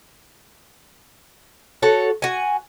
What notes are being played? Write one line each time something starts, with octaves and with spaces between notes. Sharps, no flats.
F#4 A4 C#5
F#4 G#5